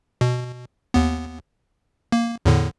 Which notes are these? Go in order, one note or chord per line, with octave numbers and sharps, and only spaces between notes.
B2
D#2 B3
A#3
E2 A2 D3